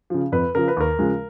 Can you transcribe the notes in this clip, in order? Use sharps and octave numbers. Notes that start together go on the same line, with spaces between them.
C#3 F3
F2 B4
C#3 F3 A#4
B4
D#2 A#4
C#3 F3 G#3